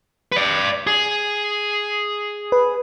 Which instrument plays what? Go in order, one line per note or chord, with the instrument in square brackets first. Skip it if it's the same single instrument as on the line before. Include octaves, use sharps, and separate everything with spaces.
[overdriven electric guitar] B4 D5
G#4
[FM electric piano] B4